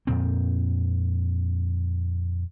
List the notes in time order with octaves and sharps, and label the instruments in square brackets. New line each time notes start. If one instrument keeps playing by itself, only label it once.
[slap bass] F2 A#2 C4